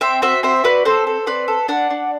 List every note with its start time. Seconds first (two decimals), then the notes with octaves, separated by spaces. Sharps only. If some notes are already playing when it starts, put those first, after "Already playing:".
0.01 C4 E5 G5
0.22 F#4 C5 E5
0.43 C4 C5 E5
0.64 F#4 B4 D5
0.85 C4 A4 C5
1.07 A4
1.26 C4 B4 D5
1.48 A4
1.68 D4 D5 F#5
1.90 D4